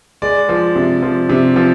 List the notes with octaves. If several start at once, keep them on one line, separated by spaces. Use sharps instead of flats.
G#3 D5
F3
C3
F3
C3
F3